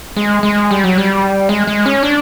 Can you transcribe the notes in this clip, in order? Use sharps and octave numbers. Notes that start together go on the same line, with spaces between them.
G#3
G#3
G3
F#3
G3
G#3
G#3
C#4
D4